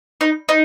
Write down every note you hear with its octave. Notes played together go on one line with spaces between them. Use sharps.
D#4
D#4